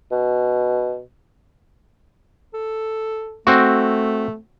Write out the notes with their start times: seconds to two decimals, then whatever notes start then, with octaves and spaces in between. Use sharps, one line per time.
0.11 B2
2.54 A4
3.47 A3 C4 F#4